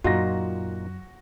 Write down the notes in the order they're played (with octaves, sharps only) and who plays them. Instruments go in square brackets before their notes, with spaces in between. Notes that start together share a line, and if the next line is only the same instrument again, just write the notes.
[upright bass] F#2 [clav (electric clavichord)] A#2 D#4 F4 [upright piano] F#4 A#6